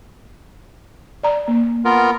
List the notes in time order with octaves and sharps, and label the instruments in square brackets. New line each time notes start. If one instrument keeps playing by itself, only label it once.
[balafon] D5 A#5
A#3
[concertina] B3 F4 A#4